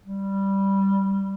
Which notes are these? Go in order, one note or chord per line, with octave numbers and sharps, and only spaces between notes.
G3